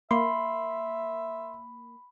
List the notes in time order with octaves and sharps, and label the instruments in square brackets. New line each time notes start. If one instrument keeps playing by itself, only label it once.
[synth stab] A#3 [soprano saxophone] E5 [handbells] B5 [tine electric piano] C6